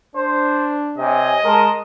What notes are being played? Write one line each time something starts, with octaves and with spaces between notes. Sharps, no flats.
D4 C5
C3 C#5 D#5 G#5
G#3 A#4 A5 C6